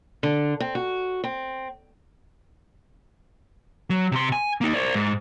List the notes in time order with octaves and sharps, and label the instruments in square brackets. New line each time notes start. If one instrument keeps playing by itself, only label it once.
[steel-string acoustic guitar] D3
C4
F#4
C4
[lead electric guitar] F#3
C3 C6
G#5
A#3 D#4
C5 D5
G#2